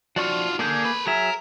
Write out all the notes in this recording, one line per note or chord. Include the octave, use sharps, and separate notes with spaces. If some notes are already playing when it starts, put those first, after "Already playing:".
F3 F4 F#4 D5 C#6
D3 A#3 G#4 G6
A4 B4
F#3 G#4 A#4 E5